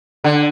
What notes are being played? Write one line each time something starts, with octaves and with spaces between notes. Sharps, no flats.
D3